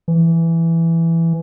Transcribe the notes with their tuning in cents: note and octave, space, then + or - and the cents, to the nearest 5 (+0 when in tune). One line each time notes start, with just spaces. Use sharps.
E3 +10